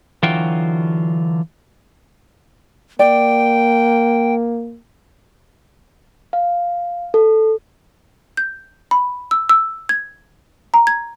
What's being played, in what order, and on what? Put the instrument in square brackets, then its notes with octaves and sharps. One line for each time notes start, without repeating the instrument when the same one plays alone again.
[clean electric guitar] D3 E3 F#3 F4 F#4 G5
[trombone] A#3 [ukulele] D5 [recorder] G5
[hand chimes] F5
A4
[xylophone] G6
B5
E6
E6
G#6
A#5
G#6